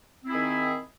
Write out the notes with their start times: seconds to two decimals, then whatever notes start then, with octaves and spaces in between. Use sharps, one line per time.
0.25 C4
0.28 E4
0.31 G#4
0.35 D#3